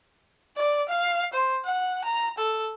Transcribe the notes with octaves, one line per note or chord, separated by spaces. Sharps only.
D5
F5
C5
F#5
A#5
A4